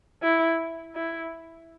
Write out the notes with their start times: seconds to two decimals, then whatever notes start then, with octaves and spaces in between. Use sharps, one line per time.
0.23 E4
0.95 E4